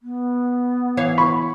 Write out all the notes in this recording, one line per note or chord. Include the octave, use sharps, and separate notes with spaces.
B3
E3 C#5 F5
B5 C#6